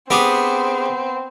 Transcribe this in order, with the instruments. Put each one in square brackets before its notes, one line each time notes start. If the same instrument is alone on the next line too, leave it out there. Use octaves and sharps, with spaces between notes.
[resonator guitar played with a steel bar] B3 [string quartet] C4 [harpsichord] D4 G4 G#4